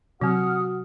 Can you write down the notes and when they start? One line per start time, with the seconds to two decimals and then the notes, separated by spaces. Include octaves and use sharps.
0.21 C3 F#3 C4 F#4 F#5 D#6 F6